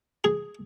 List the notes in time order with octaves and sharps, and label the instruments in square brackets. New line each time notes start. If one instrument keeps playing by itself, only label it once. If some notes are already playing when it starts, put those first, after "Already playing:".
[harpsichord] G#4